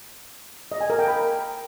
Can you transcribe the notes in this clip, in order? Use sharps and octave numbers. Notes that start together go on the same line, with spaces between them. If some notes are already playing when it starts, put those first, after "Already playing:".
D#5
G#5
A#4
G5
B5